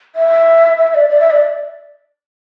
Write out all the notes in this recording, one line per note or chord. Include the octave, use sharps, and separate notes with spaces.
E5
E5
D5
D5
E5
D5